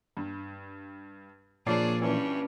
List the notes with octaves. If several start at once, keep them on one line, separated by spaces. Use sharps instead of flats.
G2
A#2 F3 A#3 D4 G#4 C#5 D5 C7
G2 E3 C#4